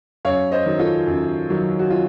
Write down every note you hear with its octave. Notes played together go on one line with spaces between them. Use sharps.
F#2 C#5 F5
C5 D#5
D#3 F#3
F4 A4
F#2
D#3 F#3
F#4
F4